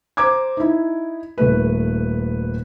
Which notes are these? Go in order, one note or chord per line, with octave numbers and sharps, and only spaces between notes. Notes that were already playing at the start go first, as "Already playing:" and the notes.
C5 A#5 D6 G#6
D#4 E4
D#1 A3 B4